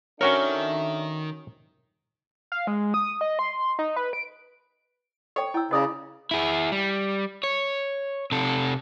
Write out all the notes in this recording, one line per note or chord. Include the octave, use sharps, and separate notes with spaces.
D#3 C#4 D4 F#4 A4 A#4 C#5 E5
F5
G#3
D#6
D#5
C6
D#4
B4
D7
A4 C#5 G5
E4 G5 E6
C#3 B4 D5 D#5 A#5 D#6
E4 G#4
G3
C#5
C3 A4